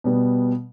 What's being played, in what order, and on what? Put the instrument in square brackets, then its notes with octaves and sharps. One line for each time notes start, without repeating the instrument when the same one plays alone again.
[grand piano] B2 G3 B3